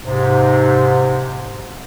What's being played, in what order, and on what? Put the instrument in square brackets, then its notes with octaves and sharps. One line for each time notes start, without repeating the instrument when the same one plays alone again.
[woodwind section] G#2 C3